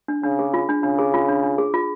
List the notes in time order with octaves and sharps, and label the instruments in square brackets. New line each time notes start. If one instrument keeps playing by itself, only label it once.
[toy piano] D4
[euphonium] C#3 [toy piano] D4
[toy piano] G#4
F4
D4
[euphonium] C#3 [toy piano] D4
[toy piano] G#4
F4
D4
D4
G#4
F4